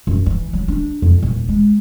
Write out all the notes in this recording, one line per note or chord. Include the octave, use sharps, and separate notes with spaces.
F#2
E3
F#3
D4
F2
D#1
G#3